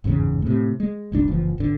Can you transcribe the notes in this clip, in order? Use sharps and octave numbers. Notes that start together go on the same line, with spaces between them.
G1 E2 G#2 C#3
A2 C3
G#3
G1 C2 D4
F#1 E3 F3
G#1 D3